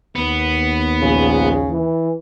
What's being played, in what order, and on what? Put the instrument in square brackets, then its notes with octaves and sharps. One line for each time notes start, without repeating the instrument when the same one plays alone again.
[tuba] D#2 [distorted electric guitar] B3
[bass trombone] A#1 [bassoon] C#3
[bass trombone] E3